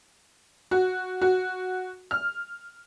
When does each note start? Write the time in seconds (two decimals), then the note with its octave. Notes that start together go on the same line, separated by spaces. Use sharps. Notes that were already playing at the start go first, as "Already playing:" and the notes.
0.71 F#4
1.21 F#4
2.11 F6